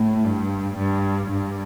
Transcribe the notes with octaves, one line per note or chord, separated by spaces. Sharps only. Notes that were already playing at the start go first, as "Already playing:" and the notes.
Already playing: A2
G2
G2
G2